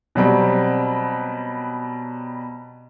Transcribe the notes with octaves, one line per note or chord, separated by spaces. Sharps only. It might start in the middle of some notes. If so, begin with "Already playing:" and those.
B2 F#3 G3 C4